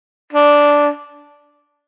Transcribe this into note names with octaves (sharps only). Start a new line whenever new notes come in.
D4